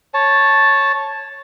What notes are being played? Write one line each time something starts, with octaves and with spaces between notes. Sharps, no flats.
C#5 A5